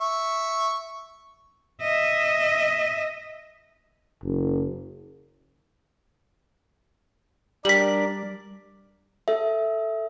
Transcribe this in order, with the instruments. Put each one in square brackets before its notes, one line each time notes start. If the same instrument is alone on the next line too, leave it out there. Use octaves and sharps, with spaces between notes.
[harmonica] E5 C#6
[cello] D#5 E5
[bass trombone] F#1
[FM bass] G3 [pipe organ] D4 A#4 D5 [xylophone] B6 F#7
[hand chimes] A4 E5